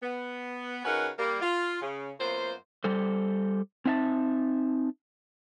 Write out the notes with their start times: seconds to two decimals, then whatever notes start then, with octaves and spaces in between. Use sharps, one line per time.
0.02 B3
0.84 C#3 C#4 D#4 F#4 A#4 B4
1.17 G3 A#3
1.40 F4
1.81 C#3
2.19 F#2 A#3 B3 F4 C5
2.84 G3 A4 C5
3.85 C4 D#4 E5 F5 A5